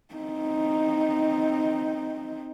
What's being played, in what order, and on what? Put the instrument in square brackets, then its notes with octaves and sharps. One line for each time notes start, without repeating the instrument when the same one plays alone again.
[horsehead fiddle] C4 D#4